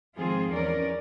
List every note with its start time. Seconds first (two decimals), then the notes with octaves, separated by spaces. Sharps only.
0.17 G#2 D#3 F3 C4 F4 G#4
0.53 E2 C#4 A#4 D5